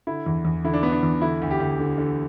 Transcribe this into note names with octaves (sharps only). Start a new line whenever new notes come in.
D3 E4
E2
E2
D3 E4
D4
D3 B3
D4
E2
D3 E4
D2
G4
D2
D3
D3